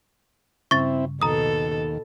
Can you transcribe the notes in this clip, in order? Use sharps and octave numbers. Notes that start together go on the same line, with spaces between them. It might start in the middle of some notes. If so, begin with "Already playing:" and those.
G2 C#3 C4 E4 C#6 A6
D#2 B2 A4 A#5 D#6